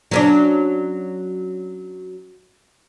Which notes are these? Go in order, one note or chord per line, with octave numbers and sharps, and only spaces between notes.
F#3 C#4 D4